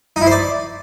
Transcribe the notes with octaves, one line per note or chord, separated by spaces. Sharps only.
D#4
E4
C5
D5